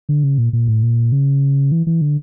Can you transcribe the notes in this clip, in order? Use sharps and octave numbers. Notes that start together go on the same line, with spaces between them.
D3
C#3
A#2
A#2
A2
A#2
C#3
E3
E3
D3